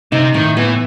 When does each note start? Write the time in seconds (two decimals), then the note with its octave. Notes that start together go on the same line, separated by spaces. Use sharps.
0.12 C3 D#4
0.34 A2 D#3
0.57 E3 B3